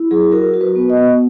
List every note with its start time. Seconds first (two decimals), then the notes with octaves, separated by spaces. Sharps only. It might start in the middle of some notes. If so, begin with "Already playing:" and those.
Already playing: E4
0.11 F#3 G#4
0.32 F#4 A#4
0.54 F#4
0.61 B4
0.76 B3
0.90 D#5
0.97 B3